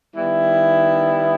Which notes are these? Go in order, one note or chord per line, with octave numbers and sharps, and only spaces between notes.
D#3 G3 B3 E4